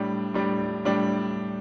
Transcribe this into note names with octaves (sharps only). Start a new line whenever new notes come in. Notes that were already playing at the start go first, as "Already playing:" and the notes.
Already playing: A2 G3 D4
A2 G3 D4
A2 G3 D4